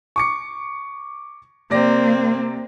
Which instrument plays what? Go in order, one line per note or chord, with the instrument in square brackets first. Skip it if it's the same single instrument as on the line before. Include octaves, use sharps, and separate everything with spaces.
[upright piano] C#6 D6 C#7
[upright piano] C3 D5 A#6 [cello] A#3 C4